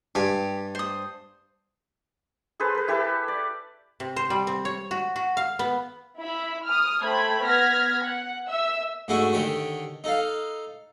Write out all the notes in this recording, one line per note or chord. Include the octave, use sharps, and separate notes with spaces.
G2 G4 G#5
C5 D#6
G#4 A4 B4 C5
A#4 B4
E4 G4 A4 B4
D5
C3
C5
G3
C4
C#5
F#4
F#4
F5
B3
E4 E5 B5
D#6 F6
A3 C5 G5 B5 G#6
B3 F6 G#6 A#6 B6
F#5
E5 E6
G#2 A3 D4 E4 F#4 G#5
D3 D#3 G4 C#5
D#4 A4 F5